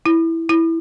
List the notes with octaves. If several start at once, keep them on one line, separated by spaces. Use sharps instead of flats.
E4
E4